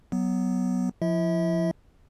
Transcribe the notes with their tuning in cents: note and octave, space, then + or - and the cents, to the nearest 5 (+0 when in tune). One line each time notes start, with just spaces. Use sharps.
F#3 +10 B3 +0
F3 +0 E4 +20 E5 -35